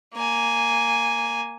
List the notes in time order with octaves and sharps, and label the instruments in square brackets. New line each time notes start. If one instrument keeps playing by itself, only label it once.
[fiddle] A#3 G#5